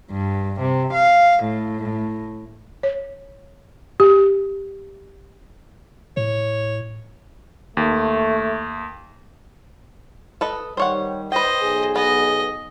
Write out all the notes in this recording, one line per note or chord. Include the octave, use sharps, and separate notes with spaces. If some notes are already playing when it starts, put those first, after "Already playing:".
G2
C3
F5
A2
C#5
G4
A2 C#5
D#2 A3
A4 B4 D#5
D#3 G3 C5 C#5 F#5
B4 C5 D#5 G5
B1 G#4
B3 D#5